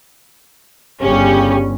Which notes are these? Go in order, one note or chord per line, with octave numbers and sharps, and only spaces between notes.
G1 C#3 G3 C#4 G4